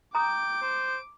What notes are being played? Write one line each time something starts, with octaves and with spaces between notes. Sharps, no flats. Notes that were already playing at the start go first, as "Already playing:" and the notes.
G5 A#5 D6 D#6 D7
C5